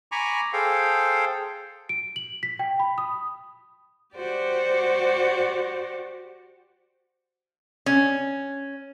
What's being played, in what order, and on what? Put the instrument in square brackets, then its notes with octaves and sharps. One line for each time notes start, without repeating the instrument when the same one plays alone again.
[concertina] G#5 A#5 B5 C#6 D6
G#4 A4 C5 F5 G5
[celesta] D7
F#7
B6
G5
B5
D#6
[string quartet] F#4 G4 C5 D5
[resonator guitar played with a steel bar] C#4